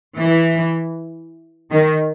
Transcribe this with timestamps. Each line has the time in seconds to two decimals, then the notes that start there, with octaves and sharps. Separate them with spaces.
0.19 E3
1.72 D#3